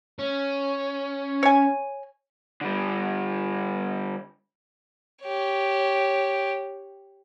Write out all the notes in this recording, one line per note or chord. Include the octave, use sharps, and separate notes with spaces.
C#4
C#5 G#5
D3 G3
G4 C#5